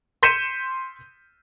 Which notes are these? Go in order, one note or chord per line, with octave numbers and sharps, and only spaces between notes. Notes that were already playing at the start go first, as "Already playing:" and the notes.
C6 G6 B6 C#7 D#7 E7